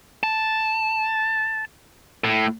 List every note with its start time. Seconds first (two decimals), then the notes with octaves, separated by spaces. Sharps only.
0.23 A5
2.24 A2